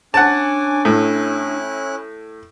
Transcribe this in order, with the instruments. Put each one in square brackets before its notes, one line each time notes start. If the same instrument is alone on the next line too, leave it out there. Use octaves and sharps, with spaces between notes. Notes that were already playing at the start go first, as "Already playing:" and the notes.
[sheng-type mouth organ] C#4 G#5 D6 [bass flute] D4 [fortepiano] F#5 A5
[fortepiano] A2 [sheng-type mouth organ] C#4 E4 F#6